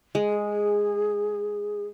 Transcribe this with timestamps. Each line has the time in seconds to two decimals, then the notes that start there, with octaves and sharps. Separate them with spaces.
0.15 G#3
0.29 G#4